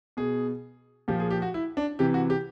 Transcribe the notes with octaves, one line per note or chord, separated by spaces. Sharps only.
B2 G#4
A#2 F3 G4
G#4
G4
F#4
E4
D4
C3 E3 G4
F#4
G4